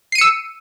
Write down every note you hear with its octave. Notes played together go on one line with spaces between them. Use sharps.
E6 C7 C#7 D#7